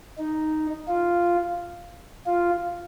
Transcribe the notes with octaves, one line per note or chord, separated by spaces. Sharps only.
D#4
F4
F4